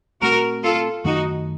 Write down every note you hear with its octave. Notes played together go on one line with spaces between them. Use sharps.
A#2 A3 C4 F#4 A#4
F4 A4
F#2 D#3 A3 D#4 F#4